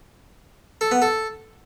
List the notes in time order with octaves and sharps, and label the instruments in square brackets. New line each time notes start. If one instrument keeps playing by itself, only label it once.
[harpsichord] A4
B3
A4